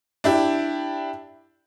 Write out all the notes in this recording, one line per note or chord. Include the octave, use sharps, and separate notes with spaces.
D4 E4 G4